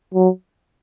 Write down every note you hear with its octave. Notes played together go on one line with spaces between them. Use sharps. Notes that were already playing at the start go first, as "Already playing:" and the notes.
F#3